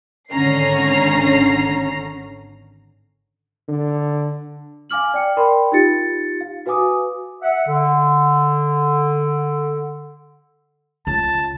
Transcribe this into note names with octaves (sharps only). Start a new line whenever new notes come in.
G#1 D3 C#4 A#5 C7
D3
F5 G#5 D6 F6 F#7
D5 G5 C#7
A#4 D5 G5 B5 C6
D#4 F4 G4 A6 C#7
F5
F#4 B4 F5 G#5 D6 D#6
E5 F#5
D3
C#2 A5